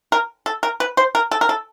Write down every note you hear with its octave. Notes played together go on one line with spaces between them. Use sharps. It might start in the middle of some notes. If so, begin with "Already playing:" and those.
A#4
A4
A#4
B4
C5
A#4
A4
A#4
A4